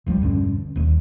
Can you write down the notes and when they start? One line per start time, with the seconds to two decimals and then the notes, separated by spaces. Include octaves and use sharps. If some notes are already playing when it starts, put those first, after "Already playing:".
0.06 F1 C#2 F3 G3
0.22 E1 G2 D3 C#4
0.76 D#1 D#2